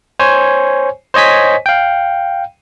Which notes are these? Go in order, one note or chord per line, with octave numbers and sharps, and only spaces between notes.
C5 C#5 G#5
C5 C#5 D#5 G#5 B6
F5 G5